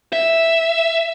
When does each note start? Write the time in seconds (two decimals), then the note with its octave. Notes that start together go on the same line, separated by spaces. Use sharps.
0.13 E5